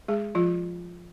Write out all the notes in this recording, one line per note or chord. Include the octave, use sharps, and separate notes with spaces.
G#3 G#4
F3 F4